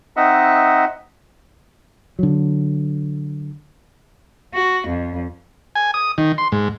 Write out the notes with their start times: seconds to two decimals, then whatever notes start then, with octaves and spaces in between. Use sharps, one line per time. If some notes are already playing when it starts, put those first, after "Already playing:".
0.17 C4 D#4 D#5 E5 F#5
2.19 D3 F#3
4.54 F#4
4.88 F2
5.76 G#5
5.94 D#6
6.18 D#3
6.38 C6
6.52 G#2